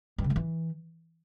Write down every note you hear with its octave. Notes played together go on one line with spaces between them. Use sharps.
G2
C#3
G#3
E3